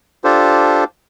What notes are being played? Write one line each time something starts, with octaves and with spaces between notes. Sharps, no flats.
D4 F4 G4 A4 C5